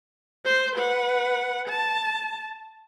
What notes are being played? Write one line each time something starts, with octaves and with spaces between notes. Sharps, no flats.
C5 C6
B4 F#5
A5